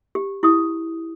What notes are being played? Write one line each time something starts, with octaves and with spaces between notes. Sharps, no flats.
G4
E4 G4 D#6